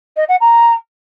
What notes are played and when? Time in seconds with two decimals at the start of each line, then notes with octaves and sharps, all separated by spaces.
0.17 D#5
0.29 F#5
0.41 A#5